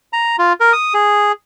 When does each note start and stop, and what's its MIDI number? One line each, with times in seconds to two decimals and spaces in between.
0.13 0.36 82
0.39 0.53 65
0.60 0.73 70
0.73 0.94 87
0.94 1.32 68